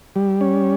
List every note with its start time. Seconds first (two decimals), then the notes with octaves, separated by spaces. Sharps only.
0.16 G3
0.41 C#4